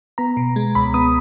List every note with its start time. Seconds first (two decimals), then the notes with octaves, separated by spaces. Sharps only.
0.18 B3 A#5
0.37 B2
0.56 G#3
0.75 C#2 B5
0.94 B3 D#6